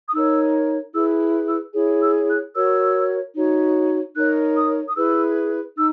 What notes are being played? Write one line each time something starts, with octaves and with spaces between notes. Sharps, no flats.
D#6
D#4 A#4 C#5 E6
E4 G#4 B4 E6
E6
E4 G#4 C#5
E6
F#6
F#4 A#4 C#5 E6
D#4 F#4 C#5
D#4 A#4 C#5 F#6
D#6
D#6
E4 G#4 B4 E6
D#4 E6